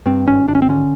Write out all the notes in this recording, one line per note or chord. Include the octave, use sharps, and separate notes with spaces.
G2 C4
G#1 C#4
G#1 D4
C#4
C4
D3 C#4